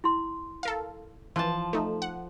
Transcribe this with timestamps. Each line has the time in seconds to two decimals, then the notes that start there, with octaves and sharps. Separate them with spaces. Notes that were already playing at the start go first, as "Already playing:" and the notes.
0.04 E4 C6
0.63 A4 A#4 F5
1.36 E3 F3 A5
1.73 A3 D#4
2.02 F#5